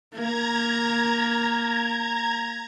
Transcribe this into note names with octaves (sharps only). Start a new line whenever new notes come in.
A#3 A#5 G#6